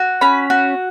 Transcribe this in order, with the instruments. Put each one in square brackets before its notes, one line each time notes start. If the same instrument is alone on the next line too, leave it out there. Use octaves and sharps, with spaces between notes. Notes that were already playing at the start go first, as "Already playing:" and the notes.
Already playing: [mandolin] F#4
C#4 B5
F#4